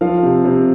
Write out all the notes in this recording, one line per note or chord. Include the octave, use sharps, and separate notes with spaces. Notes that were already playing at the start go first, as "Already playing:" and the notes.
F3 F5
C3
C3